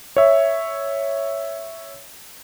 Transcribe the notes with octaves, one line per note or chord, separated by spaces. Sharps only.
C#5 E5